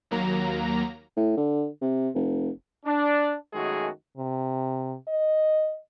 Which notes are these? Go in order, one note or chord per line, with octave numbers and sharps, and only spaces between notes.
D#2 F#3 A#3 A#5
A2
D3
C3
F1
D4
F#2 D#3 G#3 A3 F#4 G#4
C3
D#5